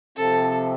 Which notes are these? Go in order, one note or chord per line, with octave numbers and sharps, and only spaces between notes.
C3 F3 C4 A4